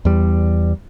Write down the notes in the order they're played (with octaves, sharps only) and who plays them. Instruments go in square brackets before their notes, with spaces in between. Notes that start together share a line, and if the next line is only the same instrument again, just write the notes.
[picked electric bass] E2 G3